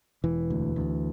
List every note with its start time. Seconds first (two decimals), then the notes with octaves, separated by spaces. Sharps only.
0.24 E1 E3
0.50 D2
0.76 D2